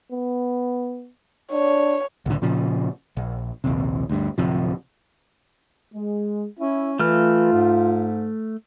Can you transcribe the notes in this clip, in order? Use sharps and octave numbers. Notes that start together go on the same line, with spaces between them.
B3
D4 C#5
C2 A2 D3
A#2 C#3 F3
A#1
A#1 D#2 C3
D2 G2
D1 C3 F3
G#3
C#4 E4
E3 A3 F4 F6
G#2